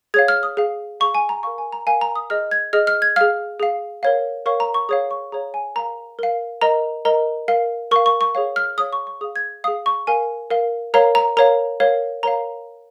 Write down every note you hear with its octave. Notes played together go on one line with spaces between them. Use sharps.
G#4 C#5 F5 G#6
F6
D#6
G#4 F5
G#4 F5 C#6
G#5
A#5
A#4 F5 C#6
G#5
A#5
A#4 F5 G#5
A#5
D#6
G#4 D#5 F6
G#6
G#4 D#5 F6
F6
G#6
G#4 F5 F6
G#4 F5
A#4 C#5 F5
A#4 C#5 F5 C#6
A#5
C#6
G#4 C#5 F5 D#6
C#6
G#4 C#5 F5 A#5
G#5
A#4 F5 A#5
A#4 F5
A#4 D#5 A#5
A#4 D#5 A#5
A#4 F5
A#4 F5 C#6
C#6
C#6
G#4 C#5 F5
F6
G#4 C#5 F5 D#6
C#6
C#6
G#4 F5 D#6
G#6
G#4 F5 D#6
C#6
A#4 F5 G#5
A#4 F5
A#4 C#5 F5 A#5
A#5
A#4 C#5 F5 A#5
A#4 C#5 F5
A#4 C#5 F5 A#5